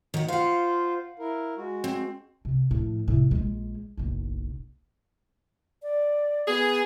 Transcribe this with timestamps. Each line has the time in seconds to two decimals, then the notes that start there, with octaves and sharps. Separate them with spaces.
0.14 D#3 F#5
0.28 F4 C5 F5 F#5
1.19 E4 A#4
1.57 G#3 F#4
1.84 C4
2.45 C3
2.71 A2 F3
3.08 A2 C3
3.31 A#1 G#3
3.97 F#1 B1
5.82 D5
6.48 B3 G#4